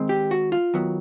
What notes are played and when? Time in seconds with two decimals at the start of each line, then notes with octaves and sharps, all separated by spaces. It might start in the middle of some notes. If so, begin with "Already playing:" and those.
Already playing: D#3 G#3 C4
0.09 G4
0.31 F#4
0.52 F4
0.74 D#3 F#3 B3